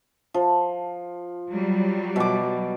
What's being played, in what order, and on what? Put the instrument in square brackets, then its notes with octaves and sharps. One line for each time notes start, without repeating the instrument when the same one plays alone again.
[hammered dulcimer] F3
[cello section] F#3 G3
[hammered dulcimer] B2 D6